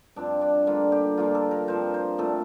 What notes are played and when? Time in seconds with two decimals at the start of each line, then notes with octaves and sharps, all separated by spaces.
0.16 G2 F3 C4 D4
0.41 D4
0.66 D3 G3 A#3 F4
0.92 G4
1.17 G2 F3 A#3 F4
1.35 A4
1.51 A#4
1.68 G2 F3 C4 C5
1.94 C5
2.18 A#2 A3 C4 A4